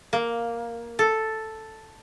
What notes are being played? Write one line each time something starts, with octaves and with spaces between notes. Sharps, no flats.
A#3
A4